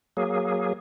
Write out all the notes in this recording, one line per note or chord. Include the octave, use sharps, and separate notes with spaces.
F#3 A#3 G#4